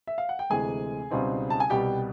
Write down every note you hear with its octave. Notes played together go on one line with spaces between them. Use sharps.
E5
F5
F#5
G5
D2 C3 E3 G#3 G#4 G#5
C#2 B2 G3 C4 D#4
A5
G#5
C2 B2 G3 G4 G5